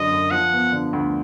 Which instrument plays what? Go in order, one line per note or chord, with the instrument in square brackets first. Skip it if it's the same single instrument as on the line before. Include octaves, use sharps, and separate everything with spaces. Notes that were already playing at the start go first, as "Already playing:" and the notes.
Already playing: [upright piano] F#2 D3 F#3 [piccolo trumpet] D#5
[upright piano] F#2
[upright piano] F3 [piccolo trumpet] F#5
[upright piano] B3
D3
D2